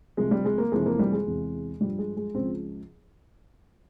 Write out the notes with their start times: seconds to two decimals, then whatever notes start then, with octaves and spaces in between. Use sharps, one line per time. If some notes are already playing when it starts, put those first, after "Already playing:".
0.17 C2 C3 F3 G#3
0.31 G3
0.45 G#3
0.58 A#3
0.72 F2 C3 E3 G#3
0.86 A#3
0.99 G3
1.12 G#3
1.26 E2 C3 E3
1.81 G2 F3 G3
1.99 G#3
2.17 G#3
2.34 C#2 C#3 F3 C4